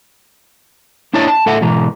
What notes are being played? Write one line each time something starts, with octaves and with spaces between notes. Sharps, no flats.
A#3 D4 E4 C#5 D#5 A5
A5
A2 A4 E5 F#5
G#2 B2 E3 A#5